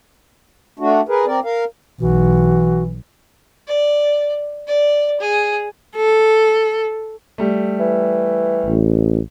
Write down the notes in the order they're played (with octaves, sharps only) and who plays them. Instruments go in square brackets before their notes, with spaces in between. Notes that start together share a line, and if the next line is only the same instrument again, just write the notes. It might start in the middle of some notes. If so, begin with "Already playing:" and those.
[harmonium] A3 D4 F#4
G#4 A#4 B4
C4 A#4 D5
A#4 F5
[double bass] B1 [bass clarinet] E3 [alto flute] F#4
[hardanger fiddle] D5
D5
G#4
[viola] A4
[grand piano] G3 A3
[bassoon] E3
[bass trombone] A1